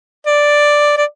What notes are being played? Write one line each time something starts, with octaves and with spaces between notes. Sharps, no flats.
D5
D5